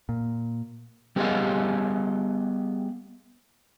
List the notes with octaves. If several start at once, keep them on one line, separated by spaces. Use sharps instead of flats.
A#2
G3 B3 G4 G#4 D#5 F5